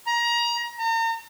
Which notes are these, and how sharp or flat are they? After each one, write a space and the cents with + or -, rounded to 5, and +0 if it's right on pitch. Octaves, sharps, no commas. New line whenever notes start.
A#5 +25
A#5 -40